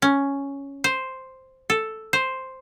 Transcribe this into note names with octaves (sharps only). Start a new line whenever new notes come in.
C#4
C5
A4
C5